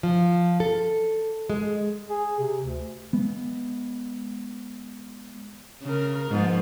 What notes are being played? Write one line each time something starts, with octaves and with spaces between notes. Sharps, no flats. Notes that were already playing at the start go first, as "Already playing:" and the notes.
F3
A4
G#3
G#4
C3
D2
G#3 B3
C#3 A#4
G#2 F3 B3